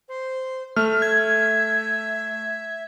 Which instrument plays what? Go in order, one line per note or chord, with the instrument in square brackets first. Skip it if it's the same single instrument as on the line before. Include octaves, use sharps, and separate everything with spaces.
[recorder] C5
[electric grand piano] A3 [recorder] E5 [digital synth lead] F6
[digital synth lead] G#6